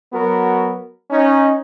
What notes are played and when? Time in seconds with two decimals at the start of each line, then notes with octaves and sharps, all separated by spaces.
0.13 F#3 B3 F#4 A#4
1.10 C#4 D#4